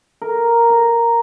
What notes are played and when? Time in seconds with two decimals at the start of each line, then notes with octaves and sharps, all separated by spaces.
0.22 A#4
0.70 A#5